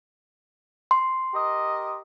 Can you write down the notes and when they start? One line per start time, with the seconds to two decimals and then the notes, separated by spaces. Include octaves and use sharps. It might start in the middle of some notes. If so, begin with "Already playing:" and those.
0.91 C6
1.34 G4 A#4 D#5